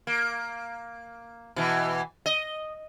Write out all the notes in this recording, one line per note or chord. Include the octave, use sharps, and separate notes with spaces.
A#3
B2 E3
D#5